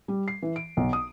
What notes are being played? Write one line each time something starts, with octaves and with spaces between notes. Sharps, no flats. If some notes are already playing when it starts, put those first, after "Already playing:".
G3
C7
E3
D7
B1
D#6